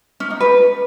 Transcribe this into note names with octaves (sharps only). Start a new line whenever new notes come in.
C#4
D#4
B4